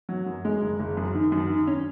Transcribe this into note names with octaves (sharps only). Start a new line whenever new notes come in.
F#3
F#2
G#3
F#1
F#1
F#2
D#3
F#2
D#3
C#4